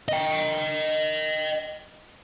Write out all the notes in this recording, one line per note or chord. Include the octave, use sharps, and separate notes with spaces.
D#5 G5